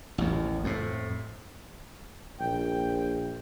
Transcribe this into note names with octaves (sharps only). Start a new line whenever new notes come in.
A1 D#2
F2 A2
A#1 G5